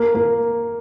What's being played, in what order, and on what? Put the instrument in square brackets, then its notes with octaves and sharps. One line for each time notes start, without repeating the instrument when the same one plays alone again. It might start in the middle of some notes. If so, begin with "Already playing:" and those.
Already playing: [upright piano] A#3
A#3